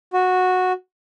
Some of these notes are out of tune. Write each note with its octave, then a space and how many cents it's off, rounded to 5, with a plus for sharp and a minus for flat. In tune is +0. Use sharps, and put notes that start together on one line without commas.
F#4 -10